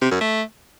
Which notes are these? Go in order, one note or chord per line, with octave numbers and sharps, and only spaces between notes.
C3
F#2
A3